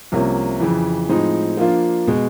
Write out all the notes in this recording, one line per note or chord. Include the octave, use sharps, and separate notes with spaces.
C2 C3 F3 A#3 C#4
F2 C#3 E3
A2 F3 G#3 C4 D#4
F3 A#3 D4 F4
B2 G#3